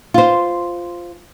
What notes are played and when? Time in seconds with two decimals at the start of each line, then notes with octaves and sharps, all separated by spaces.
0.14 F4 C5